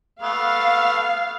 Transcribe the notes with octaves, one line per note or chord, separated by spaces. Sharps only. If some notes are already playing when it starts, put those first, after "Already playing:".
A3 B3 F5